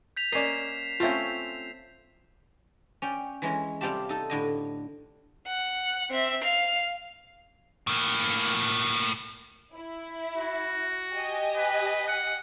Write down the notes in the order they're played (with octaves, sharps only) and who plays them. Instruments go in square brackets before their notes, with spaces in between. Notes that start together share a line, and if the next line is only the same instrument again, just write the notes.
[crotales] G6 B6 F7
[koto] A#3 C#4 D#5 [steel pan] A#4 D5 [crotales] C7 E7
[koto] A3 C4 C#4 [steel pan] F4 E5
[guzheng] C#4 D5 G5
E3 G#3 C#4
C3 G3 C4 F4 G4 A5
D#4 A4
A2 D3 D#5
[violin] F#5
C4 E5
F5 F7
[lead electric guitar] A2 A#3
[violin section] E4
[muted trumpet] F#4
[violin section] G4 D#5 G#5
[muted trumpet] B4
F#5